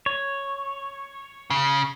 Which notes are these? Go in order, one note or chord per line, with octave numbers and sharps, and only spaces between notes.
C#5
C#3